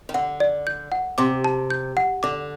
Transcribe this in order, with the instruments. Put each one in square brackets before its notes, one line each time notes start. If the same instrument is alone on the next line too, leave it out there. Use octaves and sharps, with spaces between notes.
[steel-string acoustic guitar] D#3
[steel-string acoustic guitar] D3 [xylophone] F#5
[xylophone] D5
G6
F#5
[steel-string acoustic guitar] C3 [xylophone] D6
[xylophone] A5
G6
F#5
[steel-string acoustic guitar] D3 [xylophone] D6